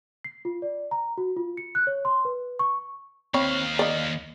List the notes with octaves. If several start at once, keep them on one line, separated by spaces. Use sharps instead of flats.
C7
F4
D5
A#5
F#4
F4
C#7
F#6
C#5
C6
B4
C#6
D#2 C4 C#5 F5 B5
D5 D#5